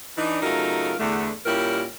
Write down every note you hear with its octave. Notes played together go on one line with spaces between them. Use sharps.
E3 D4 D#4
C#3 F#3 A3 D#4 F4 A#4
E2 D3 A3
A#2 G3 C#4 E4 G4 A#4